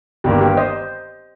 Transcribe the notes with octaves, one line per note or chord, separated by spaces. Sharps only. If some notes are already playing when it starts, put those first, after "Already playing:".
G1 G2 D#3 A#3 G4
G4
C5 D#5